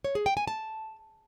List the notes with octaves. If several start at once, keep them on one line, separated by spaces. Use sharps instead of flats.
C#5
G#4
G5
G#5
A5